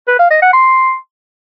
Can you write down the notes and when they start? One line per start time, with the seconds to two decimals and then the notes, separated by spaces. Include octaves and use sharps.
0.08 B4
0.19 F5
0.30 D#5
0.42 F#5
0.53 C6